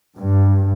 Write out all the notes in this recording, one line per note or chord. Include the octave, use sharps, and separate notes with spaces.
G2